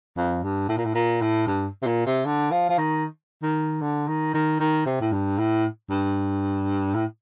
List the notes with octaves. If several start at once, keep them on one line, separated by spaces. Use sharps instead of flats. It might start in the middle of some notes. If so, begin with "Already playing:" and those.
F2
G2
A2
A#2
A2
A#2
A2
G2
C3
A#2
C3
D3
F3
F3
D#3
D#3
D3
D#3
D#3
D#3
C3
A2
G2
A2
G2
A2